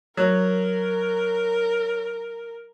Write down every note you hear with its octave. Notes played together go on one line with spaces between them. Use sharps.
F#3 A#4